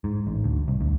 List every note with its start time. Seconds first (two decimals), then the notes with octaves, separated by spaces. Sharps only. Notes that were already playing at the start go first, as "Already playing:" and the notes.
0.04 G#2
0.27 A1
0.44 D2
0.68 C2
0.81 D2